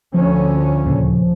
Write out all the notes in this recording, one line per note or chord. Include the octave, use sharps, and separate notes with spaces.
D2 D3 F3 C#4
D#2 A#2 C#3